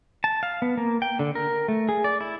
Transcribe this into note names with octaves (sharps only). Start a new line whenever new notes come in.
A5
F5
B3
A#3
G5
D3
A#4
A3
G#4
D5
E4